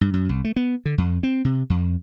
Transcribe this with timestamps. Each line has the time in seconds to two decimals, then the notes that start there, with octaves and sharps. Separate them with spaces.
0.01 G2
0.14 F#2
0.29 C2
0.44 A3
0.56 B3
0.85 D3
0.98 F2
1.23 C4
1.45 C3
1.70 F2